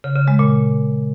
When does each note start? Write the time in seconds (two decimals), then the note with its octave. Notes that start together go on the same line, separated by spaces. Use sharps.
0.04 C#3
0.16 C#3
0.28 G#3
0.39 A#2